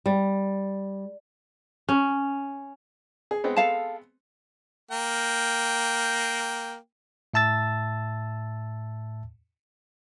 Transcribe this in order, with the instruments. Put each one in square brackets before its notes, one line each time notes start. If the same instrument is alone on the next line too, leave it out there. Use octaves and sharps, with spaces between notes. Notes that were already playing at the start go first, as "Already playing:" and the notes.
[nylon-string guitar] G3
[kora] C#4
[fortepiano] G#4
G#3 B3 C4
[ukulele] A4 F5 A5
[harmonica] A#3 G5
[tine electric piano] A2 E5 A5 E6 A6